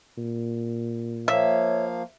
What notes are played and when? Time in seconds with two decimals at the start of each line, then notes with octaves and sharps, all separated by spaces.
0.17 A#2
1.28 F3 A#3 C#5 E5 F5